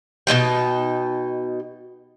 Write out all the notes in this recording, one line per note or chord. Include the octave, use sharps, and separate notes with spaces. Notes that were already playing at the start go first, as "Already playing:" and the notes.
B2 C4 D#4 G5